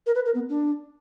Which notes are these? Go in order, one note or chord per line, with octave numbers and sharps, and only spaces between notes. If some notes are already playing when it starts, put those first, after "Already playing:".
A#4
B4
A#4
B3
D4